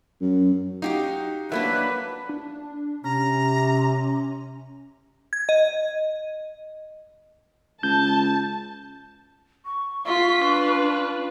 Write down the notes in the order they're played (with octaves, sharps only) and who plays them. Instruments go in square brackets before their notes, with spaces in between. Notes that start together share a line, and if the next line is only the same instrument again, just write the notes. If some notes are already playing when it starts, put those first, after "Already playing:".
[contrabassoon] F#2
[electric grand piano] D#4 [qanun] F#4 G4 F5
[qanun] F#3 A#3 D4 [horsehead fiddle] B4 [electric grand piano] E5
[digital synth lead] D4
[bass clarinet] C3 [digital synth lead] C#4 [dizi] A#5
[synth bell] G#6
D#5
[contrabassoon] C#2 [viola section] A5 [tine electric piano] G6
[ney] C#6
[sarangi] F4 [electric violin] C6 B6
[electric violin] D4 B4